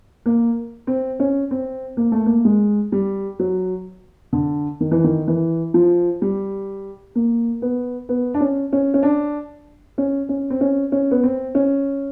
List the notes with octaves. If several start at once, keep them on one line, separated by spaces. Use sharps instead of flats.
A#3
C4
C#4
C4
A#3
A3
A#3
G#3
G3
F#3
D3
D#3
E3
D#3
E3
F3
G3
A#3
B3
B3
D4
C#4
C#4
C#4
D4
C#4
C#4
C4
C#4
C#4
B3
C4
C#4